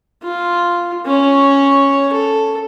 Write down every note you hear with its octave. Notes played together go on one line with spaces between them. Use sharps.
F4
C#4 C#5
A4